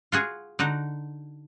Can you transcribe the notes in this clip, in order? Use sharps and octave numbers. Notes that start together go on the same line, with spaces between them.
F4 F#4 G#4
D3 D#4 F#4